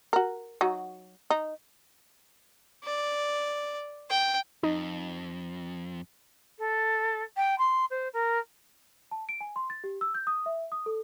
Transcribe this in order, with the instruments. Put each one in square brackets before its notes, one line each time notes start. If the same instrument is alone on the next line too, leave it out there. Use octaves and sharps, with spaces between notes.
[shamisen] F#4 A#4
F#3 D#4 F#4
D#4
[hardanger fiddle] D5
G5
[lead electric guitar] F2 [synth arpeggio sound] D#4
[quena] A4
G5
C6
C5
A#4
[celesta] A5
D7
G#5
C6
A6
G4
E6
G6
D#6
E5
D#6
A4